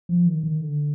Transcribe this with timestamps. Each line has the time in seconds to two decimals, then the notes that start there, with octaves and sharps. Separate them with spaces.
0.09 F3
0.26 D#3
0.43 D#3
0.61 D3